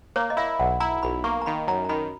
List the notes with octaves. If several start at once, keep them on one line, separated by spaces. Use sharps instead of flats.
A#3 C#5
D#5
E4 E5
B1 F#5
E4 A#5
B1 B5
A#3 C#6
A#5
D#3 B5
F#2 A#5
A#5
D#3 B5